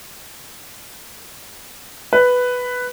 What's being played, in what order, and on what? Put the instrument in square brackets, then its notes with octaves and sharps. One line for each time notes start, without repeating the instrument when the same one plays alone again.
[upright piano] B4